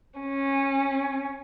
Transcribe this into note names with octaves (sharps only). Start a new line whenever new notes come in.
C#4